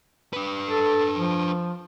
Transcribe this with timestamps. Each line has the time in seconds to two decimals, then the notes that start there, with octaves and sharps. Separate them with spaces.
0.33 D4 B4
0.67 A4
1.17 F3